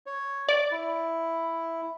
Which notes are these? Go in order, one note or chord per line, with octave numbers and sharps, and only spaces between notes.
C#5
D5
E4